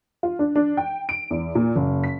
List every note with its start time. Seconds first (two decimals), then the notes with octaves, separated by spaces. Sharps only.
0.23 F4
0.39 D4
0.56 D4
0.77 G5
1.09 D7
1.30 E2
1.55 A#2
1.76 F#1
2.04 B6